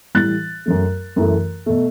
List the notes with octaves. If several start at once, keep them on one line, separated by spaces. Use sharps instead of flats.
A2 E3 G3 F#6 A6
F#2 F#3 A3
F#2 E3 A3
B2 A3